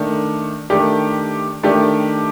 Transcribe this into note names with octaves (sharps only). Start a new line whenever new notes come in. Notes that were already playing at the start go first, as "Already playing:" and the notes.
Already playing: D#3 A3 D4
D#3 A3 D4 G4
D#3 A3 D4 G4